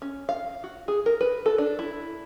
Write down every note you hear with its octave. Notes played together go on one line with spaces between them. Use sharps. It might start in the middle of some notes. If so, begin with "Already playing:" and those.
C#4
F5
F#4
G#4
A#4
B4
A4
D4
E4